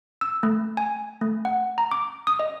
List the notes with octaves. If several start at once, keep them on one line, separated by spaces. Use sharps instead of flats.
E6
A3
G#5
A3
F#5
A#5
D6
D#6
D#5